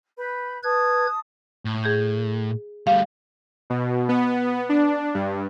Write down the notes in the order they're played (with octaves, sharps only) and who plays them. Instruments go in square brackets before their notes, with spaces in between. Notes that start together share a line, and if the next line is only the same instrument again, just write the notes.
[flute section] B4 B5 G6
[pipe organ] B4 G#6 [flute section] A5 D#6
[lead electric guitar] A2
[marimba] G#4 G6
[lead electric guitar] G3 A3 [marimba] F5
[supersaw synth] B2
B3
D4
G2